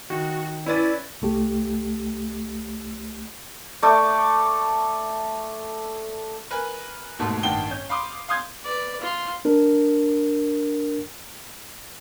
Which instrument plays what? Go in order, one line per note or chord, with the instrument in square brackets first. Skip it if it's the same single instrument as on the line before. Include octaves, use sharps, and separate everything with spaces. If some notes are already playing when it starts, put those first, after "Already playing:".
[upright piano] D#3 [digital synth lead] F#4
[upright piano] C#4 B4 A6 [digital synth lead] E4 [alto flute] D5
[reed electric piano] C2 A3 G4
[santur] A3 D5
[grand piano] A#4 B4 G#5
D#1 G#2 B2 A3
A1 G2 D#3 F#5 G5 G7
C#4 G6
F5 B5 C6 D6 D#6
F5 C6 D#6 G6 G#6
[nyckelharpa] B4 D5
F4 C6
[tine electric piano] D4 A#4